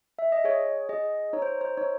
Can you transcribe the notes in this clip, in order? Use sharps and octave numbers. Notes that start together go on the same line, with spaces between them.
E5
D#5
G#4 C#5
G#4 D#5
D#4 C#5
C5
C5
D#4 C#5